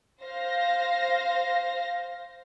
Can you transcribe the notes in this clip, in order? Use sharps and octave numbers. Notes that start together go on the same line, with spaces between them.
C5 F5 A#6